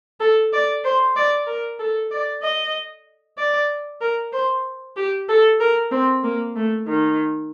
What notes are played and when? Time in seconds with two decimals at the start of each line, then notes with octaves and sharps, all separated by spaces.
0.20 A4
0.53 D5
0.85 C5
1.16 D5
1.47 A#4
1.79 A4
2.11 D5
2.43 D#5
3.38 D5
4.01 A#4
4.33 C5
4.97 G4
5.29 A4
5.60 A#4
5.92 C4
6.24 A#3
6.56 A3
6.87 D#3